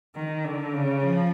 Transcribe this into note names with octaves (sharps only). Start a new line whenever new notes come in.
D#3
D3
C#3
F3